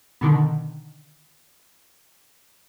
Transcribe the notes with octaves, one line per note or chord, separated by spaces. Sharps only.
B2 D3 D#3